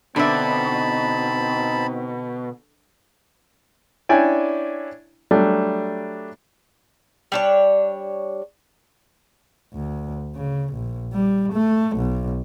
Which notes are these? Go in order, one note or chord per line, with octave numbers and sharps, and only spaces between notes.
B2 D3 C4 D#4 D5 E5 A5 B5
C#4 D4 E4 D5 G5 G#5
F#3 G3 A3 D4
G3 D4 C#5
D2
C#3
A#1
G3
A3
B1